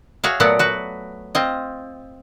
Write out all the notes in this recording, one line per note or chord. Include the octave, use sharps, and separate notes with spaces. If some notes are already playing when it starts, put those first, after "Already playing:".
F#4 G#4 C#5 E5 F5
A#2 F#3 A3 B3 D5 F#5
F#4 B4
C4 F4 D#5